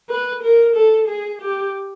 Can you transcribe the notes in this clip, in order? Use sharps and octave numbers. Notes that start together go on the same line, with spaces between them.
B4
A#4
A4
G#4
G4